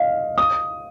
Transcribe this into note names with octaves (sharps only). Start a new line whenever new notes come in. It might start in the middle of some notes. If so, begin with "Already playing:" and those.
Already playing: D#5 F5
D#6